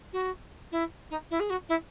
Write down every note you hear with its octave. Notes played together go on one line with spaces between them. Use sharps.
F#4
E4
D#4
E4
G#4
F#4
E4